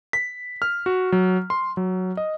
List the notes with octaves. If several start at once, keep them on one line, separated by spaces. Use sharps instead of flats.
B6
F6
F#4
F#3
C6
F#3
D#5